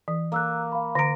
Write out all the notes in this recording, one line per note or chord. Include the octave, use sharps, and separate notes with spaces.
E3
A#3 A#5 E6 F#6
F5 B5
D3 A#5 A#6 D7